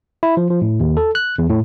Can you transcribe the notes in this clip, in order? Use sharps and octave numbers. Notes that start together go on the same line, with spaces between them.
E4
F3
F3
A2
D#2
A4
F#6
E2
A2